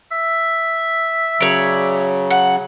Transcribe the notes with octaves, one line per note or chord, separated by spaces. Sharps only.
E5
C#3 F#3 C#5 D5
F#5